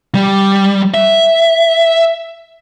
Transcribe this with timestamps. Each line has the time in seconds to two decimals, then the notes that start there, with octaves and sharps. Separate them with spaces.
0.15 G3
0.94 E5